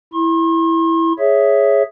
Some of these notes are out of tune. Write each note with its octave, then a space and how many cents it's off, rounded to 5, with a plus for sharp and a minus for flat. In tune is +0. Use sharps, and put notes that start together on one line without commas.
E4 +0 C6 +45
G#4 +0 C#5 +0 E5 +0